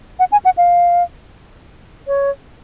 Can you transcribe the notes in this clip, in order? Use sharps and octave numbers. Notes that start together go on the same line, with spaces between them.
F#5
G#5
F#5
F5
C#5